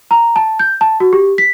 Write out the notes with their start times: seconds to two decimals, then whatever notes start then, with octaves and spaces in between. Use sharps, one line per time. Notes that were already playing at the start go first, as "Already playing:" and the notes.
0.11 A#5
0.36 A5
0.59 G6
0.81 A5
1.00 F#4
1.13 G4
1.38 B6